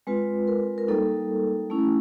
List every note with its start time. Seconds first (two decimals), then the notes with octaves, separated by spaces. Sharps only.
0.07 G#3 C4 F4 B4
0.48 A#4
0.78 A#4
0.88 G3 A#3 D#4 A4
1.70 A3 C#4 E4